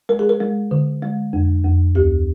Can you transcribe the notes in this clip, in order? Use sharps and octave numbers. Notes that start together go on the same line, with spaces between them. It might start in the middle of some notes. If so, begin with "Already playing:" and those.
G#3 A#4
G#4
A#4
G#3
D3
G#3
F2
F2
D2 G4